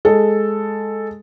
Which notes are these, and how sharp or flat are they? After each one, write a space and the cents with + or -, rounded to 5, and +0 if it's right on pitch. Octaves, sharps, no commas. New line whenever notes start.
G#3 +0 A4 +0